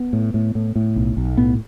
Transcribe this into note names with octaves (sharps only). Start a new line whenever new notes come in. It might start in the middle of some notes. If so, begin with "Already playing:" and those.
Already playing: B3
A2
A2
A2
A2
B1
B1
A2 B3